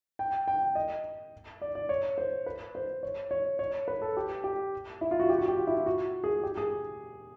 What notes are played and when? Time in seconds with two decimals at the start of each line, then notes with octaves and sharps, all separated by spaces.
0.19 G5
0.48 G5
0.75 D#5
1.61 D5
1.75 D5
1.89 C#5
2.18 C5
2.46 B4
2.75 C5
3.03 C#5
3.31 C#5
3.59 C#5
3.88 B4
4.02 A4
4.17 G4
4.44 G4
5.01 E4
5.11 F4
5.20 F#4
5.29 G4
5.39 F#4
5.48 G4
5.57 F4
5.67 E4
5.77 F4
5.86 F#4
6.24 G#4
6.43 G4
6.57 G#4